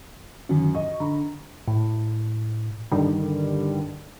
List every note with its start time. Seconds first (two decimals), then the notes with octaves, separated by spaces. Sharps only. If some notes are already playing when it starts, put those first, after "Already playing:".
0.49 F#2 D3 D#3 C#4
0.75 D#5 C#6
1.00 D3 A#5 B5 C#6
1.68 A2
2.91 G2 D3 D#3 G3